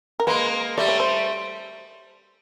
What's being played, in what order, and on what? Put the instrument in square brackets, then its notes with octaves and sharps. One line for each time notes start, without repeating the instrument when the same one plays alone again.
[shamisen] A#4
[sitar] G#3 A#3 [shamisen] B4
[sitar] G3 A3 [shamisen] D5
[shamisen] C#5
C5